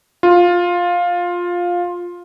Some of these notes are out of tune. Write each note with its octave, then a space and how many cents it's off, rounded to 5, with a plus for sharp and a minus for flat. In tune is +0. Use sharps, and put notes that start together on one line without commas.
F4 +10